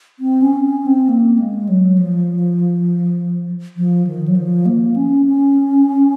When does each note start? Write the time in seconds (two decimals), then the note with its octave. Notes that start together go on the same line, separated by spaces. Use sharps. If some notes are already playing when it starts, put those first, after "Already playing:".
0.19 C4
0.42 C#4
0.64 C#4
0.86 C4
1.09 A#3
1.39 G#3
1.69 F#3
1.98 F3
3.77 F3
4.07 D#3
4.28 F#3
4.36 F3
4.66 A#3
4.96 C#4
5.26 C#4